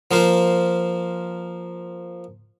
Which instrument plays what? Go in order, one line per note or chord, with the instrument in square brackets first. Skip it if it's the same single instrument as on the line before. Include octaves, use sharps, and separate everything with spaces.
[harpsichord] F3 A#3 F4 C5